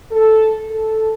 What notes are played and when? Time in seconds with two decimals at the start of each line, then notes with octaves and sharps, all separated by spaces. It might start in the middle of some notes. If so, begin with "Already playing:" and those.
0.10 A4
0.69 A4